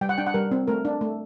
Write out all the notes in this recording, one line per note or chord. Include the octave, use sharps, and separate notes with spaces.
G3 G5
F#5
D4 G5
F#5
G3 A#4
C4
A3 A#4
D4
A3